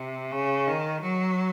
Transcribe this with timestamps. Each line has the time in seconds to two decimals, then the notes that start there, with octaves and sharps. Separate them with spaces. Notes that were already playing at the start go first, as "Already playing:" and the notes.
Already playing: C3
0.31 C#3
0.66 D#3
1.01 F#3